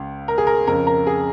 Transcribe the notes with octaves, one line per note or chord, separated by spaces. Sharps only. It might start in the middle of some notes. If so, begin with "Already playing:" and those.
Already playing: C#2 C#3
A#4
G#4
A#4
F2 C#3 A#4
A#4
G#4